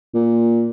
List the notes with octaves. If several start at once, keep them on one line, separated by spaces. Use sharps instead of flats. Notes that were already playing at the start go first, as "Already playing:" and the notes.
A#2